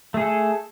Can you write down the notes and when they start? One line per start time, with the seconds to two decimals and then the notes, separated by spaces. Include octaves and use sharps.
0.14 A3
0.17 G#4
0.20 A4